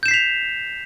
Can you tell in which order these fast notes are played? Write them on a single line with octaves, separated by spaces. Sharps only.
G6 E7 C7 B6 F7